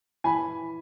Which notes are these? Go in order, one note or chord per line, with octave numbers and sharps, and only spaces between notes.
E3 G#5 B5